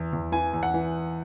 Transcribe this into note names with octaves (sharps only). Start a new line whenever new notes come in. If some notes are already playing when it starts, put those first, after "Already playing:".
Already playing: E2 E3
E2
E3 G#5
E2
F#5
E3